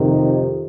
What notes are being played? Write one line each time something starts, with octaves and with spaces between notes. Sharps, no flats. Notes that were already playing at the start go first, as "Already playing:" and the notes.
Already playing: F2 C3 D#3